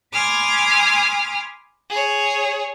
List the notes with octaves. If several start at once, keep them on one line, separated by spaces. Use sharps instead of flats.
G#5 B5 C6 D6 D#6 F6
G#4 C#5